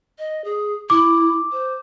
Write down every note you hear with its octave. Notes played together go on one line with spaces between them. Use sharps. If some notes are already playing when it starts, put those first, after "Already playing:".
D#5
G#4
E4 D6
C5